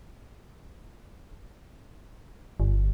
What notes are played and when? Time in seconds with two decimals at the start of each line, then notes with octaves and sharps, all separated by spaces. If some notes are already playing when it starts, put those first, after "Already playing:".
2.60 G1